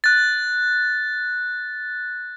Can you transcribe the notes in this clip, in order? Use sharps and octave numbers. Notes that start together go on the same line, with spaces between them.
F#6 A6